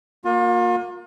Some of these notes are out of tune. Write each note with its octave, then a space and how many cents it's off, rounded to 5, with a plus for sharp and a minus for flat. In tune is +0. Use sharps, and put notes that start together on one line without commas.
A#3 +0 F4 +40